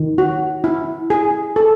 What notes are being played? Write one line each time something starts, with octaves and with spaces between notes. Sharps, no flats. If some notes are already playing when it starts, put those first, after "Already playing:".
Already playing: D#3
F#4
E4
G#4
A4